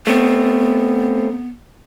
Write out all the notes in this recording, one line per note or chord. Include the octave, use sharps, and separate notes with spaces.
A3 B3 C4